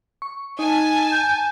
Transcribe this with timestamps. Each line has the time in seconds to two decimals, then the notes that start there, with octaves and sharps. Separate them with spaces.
0.22 C#6
0.59 D#4 G#5 A5
1.12 G6